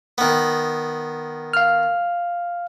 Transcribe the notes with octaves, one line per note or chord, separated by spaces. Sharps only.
D#3 B3
F5 F6